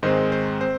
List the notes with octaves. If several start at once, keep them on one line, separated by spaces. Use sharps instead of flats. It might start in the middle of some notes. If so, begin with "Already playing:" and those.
G#2 D#3 G#3 C4 C5 D#5
C5
C4 C5